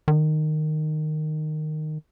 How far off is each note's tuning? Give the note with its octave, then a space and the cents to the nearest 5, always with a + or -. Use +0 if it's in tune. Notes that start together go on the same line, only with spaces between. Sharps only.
D#3 -15